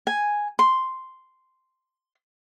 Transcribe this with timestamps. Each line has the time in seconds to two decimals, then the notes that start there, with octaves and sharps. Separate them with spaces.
0.07 G#5
0.59 C6